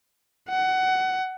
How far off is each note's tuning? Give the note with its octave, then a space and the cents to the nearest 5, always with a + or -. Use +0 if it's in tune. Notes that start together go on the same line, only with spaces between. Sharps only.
F#5 +20